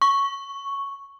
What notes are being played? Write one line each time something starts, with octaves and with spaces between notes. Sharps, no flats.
C#6